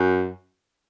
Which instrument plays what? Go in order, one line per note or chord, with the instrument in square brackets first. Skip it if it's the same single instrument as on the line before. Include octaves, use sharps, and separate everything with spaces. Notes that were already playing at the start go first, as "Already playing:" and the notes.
Already playing: [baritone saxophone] F#2